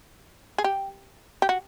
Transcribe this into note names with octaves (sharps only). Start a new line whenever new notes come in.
G#4
G4
G4
F#4